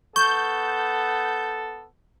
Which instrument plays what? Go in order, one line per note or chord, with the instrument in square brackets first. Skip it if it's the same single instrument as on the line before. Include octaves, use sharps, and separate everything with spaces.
[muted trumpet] B3 [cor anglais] A4 [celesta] C#6 [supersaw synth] G6